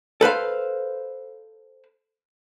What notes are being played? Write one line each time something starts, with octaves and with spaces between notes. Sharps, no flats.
A4 B4 C5 F5